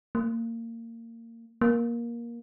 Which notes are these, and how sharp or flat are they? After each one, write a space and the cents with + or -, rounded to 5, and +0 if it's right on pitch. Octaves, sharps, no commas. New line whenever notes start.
A#3 -25
A#3 +15